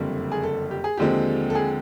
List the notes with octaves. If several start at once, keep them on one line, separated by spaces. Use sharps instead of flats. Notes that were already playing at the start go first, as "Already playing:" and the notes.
Already playing: F#1 F2 D3 G3
G#4
A4
G4
G#4
D#2 D3 F3 G#3 C4 G4
A4
G#4